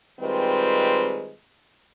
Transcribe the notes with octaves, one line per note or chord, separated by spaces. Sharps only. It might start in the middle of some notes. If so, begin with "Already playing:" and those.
D#3 G3 G#3 C4 F4 B4